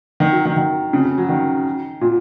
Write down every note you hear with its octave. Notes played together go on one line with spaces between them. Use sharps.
D#3
F#3
D#3
D#3
C#3
C#3
F#3
D#3
A#2